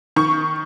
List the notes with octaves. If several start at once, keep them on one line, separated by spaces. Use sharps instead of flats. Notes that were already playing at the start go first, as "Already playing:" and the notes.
D#3 C#6